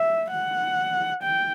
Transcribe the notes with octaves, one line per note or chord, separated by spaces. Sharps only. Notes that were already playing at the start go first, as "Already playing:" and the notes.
Already playing: E5
F#5
G5